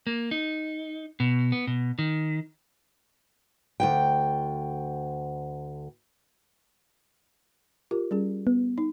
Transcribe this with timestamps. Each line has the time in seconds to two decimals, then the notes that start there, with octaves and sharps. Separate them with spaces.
0.07 A#3
0.31 D#4
1.20 B2
1.52 B3
1.67 B2
1.99 D#3
3.80 D2 G2 G5
7.91 F4 G4 A#4
8.11 G3 C#4 G#4
8.47 B3
8.78 D#4